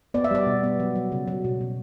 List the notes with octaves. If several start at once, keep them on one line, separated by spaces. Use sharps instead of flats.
B3 D5
E5
G3 D5
B2
B3
F#3
F#3
C#3
F#3
B2
B2